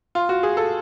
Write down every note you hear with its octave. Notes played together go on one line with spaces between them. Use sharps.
F4
F#4
G#4
A4